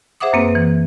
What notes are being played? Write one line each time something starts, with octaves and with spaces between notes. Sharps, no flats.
G#4 C5 E5 F#5 D6 D#6
F#2 A#3 C4 B4
E3